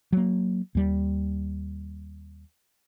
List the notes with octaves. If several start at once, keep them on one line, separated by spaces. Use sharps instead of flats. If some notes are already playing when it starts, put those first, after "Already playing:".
F#3 A#3
D#2 G3